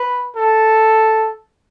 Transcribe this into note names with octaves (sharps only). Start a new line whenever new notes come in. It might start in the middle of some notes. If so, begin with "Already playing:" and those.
Already playing: B4
A4